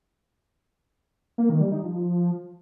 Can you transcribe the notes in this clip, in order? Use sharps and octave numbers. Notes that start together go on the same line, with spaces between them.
A#3
D#3
G3
D#4
F3